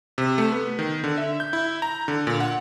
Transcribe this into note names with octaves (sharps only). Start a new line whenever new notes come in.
C3
A3
B3
D#3
D3
E5
G6
E4
A#5
D3
A#2
F#5